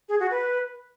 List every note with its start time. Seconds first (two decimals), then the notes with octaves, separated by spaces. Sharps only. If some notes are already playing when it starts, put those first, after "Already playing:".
0.09 G#4
0.20 F#4
0.31 B4